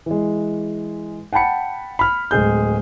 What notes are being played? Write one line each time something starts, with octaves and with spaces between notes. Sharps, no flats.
E3 G#3
F#5 G5 A5 B5 C#7
B5 F6
D1 G#3 G#4 G6